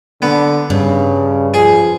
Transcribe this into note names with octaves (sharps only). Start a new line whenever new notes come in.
D3 B3
G2 C#3
F3 G#4